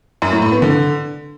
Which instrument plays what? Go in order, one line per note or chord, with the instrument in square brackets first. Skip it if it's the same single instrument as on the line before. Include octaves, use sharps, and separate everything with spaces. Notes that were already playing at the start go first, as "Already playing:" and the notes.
[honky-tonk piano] F#2
A2
A2
B3
D3